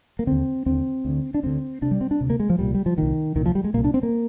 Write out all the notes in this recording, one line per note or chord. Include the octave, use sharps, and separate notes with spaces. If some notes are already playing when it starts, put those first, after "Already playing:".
A#3
D#2 D3 C4
D#2 D3 C4
D2 D3
D4
D2 D3 C4
D2 C3 D4
G3
C4
D4
D2 C3
A#3
G#3
F3
C2 A#2 G3
G3
F3
C2 A#2 D#3
C2 A#2 D#3
F3
G3
G#3
C2 A#2 A#3
D4
C4
A#3